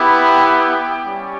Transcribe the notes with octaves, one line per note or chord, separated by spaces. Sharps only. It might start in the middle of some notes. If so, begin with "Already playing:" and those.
Already playing: B3 E4 G4
G5
G3 C#4 G4